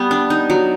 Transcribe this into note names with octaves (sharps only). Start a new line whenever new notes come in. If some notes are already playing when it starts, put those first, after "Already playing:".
Already playing: G3 B3
D4
D#4
F#3